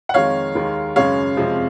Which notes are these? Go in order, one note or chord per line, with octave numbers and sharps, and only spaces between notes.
F#5
F2 D#3 G#3 C#5 F5
D#2 D#3 G#3
F#2 C#3 G#3 C#5 F5
F2 C3 F3 G#3